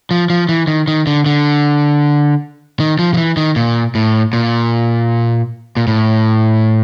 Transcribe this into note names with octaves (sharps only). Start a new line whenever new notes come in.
F3
F3
E3
D#3
D#3
D3
D3
D#3
F3
F3
E3
D#3
A#2
A2
A#2
A#2
A2